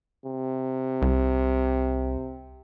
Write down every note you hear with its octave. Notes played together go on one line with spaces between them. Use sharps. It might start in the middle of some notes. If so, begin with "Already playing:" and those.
C3
C2